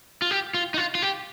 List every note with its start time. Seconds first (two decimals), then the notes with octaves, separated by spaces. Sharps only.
0.22 F4
0.31 G4
0.54 F4
0.74 D#4
0.77 F4
0.95 F4
1.02 G4